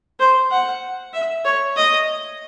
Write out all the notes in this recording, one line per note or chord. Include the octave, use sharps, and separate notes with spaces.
C5
F#5
E5
C#5
D#5